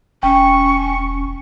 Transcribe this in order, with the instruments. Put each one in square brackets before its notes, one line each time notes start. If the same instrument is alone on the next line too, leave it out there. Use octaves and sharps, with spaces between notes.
[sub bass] E1 [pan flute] C#4 [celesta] G5 [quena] C#6